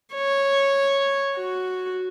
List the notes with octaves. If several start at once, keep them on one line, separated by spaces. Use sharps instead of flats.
C#5
F#4